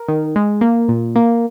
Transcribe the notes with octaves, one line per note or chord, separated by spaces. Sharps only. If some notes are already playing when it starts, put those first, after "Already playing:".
Already playing: A#4
D#3
G#3
A#3
A#2
A#3